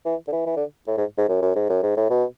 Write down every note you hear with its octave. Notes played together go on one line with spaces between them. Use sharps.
E3
D3
E3
E3
D3
A2
G#2
G#2
F#2
F#2
G#2
F#2
G#2
A2
B2